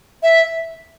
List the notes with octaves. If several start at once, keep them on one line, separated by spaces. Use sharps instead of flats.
E5